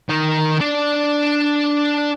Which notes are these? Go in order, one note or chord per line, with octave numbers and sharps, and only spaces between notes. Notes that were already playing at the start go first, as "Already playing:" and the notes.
D#3 D#4
D4 D5